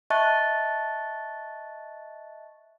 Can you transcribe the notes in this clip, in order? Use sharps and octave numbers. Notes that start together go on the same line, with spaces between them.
D#5 E5 A5 C#6 F#6 A6